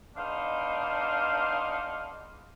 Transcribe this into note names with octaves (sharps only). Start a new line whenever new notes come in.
G#3 B3 D4 D#4 C5 F5